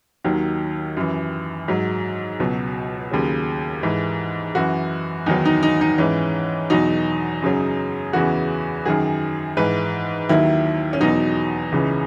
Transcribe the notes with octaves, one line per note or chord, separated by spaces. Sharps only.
D#2 D#3 F#3
F#2 E3
G#2 F#3
C#2 B2 F#3
D#2 C#3 F#3
G#2 E3
F#2 E3 F#4
E2 D#3 F#3 D#4
D#4
D#4
D#4
G#2 E3 C#4
E2 B2 F#3 D#4
F#2 C#3 F#3
E2 C#3 E3 F#4
F#2 D#3 F#3 G#4
G#2 E3 B4
D#2 D#3 F#3 E4
C#4
E2 B2 F#3 D#4
C#2 C#3 E3